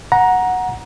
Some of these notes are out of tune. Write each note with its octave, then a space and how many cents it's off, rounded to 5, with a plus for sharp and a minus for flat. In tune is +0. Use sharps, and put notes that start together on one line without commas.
F#5 -10 A#5 +15